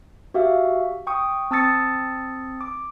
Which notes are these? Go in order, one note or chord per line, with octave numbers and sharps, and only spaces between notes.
F#4 G4 E5 F5
G5 C#6 D#6
C4 A5 D#6 E6 A6 C#7
D6